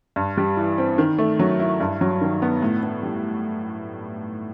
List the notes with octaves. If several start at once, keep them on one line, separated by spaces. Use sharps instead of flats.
G2
G3
E3
C4
D#3
A3
F#3
E4
G2
F#3
D#3
B3
A2
B3
G3